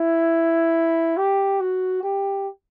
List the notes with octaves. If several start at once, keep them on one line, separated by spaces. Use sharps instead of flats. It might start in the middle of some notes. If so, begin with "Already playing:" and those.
Already playing: E4
G4
F#4
G4